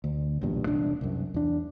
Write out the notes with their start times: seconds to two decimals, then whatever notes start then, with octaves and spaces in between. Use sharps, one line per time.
0.04 D2
0.41 B1 E2 G2 A#2
0.65 E1 C2 D4
1.01 C2 F#2
1.34 E2 D4